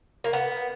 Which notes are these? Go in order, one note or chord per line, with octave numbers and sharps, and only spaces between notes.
A#3
B3